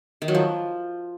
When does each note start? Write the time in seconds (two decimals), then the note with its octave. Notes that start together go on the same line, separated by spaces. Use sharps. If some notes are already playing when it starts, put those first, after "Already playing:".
0.22 D#3
0.28 F#3
0.35 F3